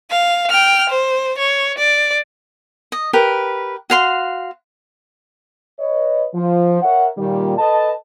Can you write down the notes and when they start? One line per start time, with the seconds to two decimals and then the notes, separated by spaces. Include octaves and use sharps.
0.11 F5
0.50 G5 F6
0.89 C5
1.38 C#5
1.78 D5
2.92 D#5
3.13 G4 A#4 B4
3.90 F#4 F5 C6
5.80 B4 C#5 D#5
6.34 F3
6.83 A#4 C#5 E5 F#5
7.18 A#2 D#3 G3
7.58 A4 B4 D#5 A5